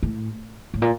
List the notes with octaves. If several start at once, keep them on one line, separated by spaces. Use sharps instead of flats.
A2
A2
A#2